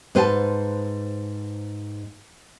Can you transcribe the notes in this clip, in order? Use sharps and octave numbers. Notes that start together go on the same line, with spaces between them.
G#2 B4 C5 G5 A5